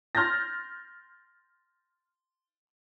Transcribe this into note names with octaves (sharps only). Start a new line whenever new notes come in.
C6 F6 G6 A6 A#6